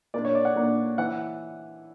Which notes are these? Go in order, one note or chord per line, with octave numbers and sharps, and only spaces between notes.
A#2 A#3 D4 D5
C#5
D5
F#5
A#2 A#3 D4
E3 F#5